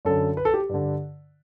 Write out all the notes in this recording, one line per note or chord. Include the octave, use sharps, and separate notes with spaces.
F#2 D3 A4
B4
A4
G4
G2 D3